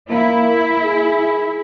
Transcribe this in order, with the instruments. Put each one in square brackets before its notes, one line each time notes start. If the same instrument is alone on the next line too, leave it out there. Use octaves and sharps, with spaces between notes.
[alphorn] A#3 [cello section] E4
[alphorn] G#4